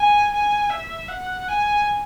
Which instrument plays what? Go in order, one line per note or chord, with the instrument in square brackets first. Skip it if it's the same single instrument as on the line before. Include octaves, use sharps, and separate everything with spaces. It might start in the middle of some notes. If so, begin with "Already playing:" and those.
Already playing: [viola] G#5
G#5
E5
F#5
G#5